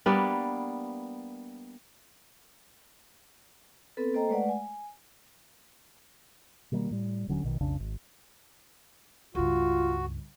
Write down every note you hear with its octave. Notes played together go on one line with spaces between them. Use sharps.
G3 A#3 B3 D4
B3 C4 A4 B4
A#3 A4 C5 D#5 G5 A#5
G#3 A3 B4 D5 F#5
G#5
B2 D#3 G3 A#3
A2 G3
D#1 D3 F#3 C#4
A#1 B2 D#3
B1 F2 C#3 D4
G#1
C#2 G2 F4 F#4